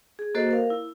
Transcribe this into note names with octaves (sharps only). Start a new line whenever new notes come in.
G#4
A#3 F#4 A4 C5 D#5
A#4 F5
E4